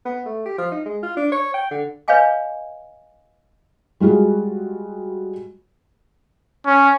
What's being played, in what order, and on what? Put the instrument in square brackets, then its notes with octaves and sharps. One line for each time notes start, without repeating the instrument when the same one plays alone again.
[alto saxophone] B3
A3
G4
F3
D#4
G#3
F4
D4
C#5
G5
D3
[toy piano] B4 C#5 D#5 F5 G#5 D6
[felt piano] G3 G#3 F4 F#4 G#4
[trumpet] C#4